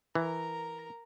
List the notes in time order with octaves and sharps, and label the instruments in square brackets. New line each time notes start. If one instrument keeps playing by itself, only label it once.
[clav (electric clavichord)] E3 [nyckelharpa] A#4 A#5